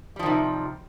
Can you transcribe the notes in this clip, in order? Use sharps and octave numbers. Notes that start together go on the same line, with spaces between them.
C3 D#3 F3 G3